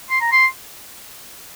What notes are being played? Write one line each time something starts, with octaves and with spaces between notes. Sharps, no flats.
C6
A#5
C6